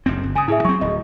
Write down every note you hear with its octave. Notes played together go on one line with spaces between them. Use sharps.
F#1 F#2 C4
G1
C#3 G#5 D#6
A2 E4 G#4 E5
F#3 C4 C#6
D1 D#5